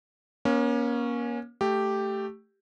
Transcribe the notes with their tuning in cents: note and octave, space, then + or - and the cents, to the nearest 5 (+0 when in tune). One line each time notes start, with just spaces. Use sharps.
A#3 +35 C#4 +0
A3 +0 G4 +0